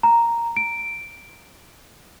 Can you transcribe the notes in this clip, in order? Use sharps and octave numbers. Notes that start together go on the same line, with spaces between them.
A#5
D7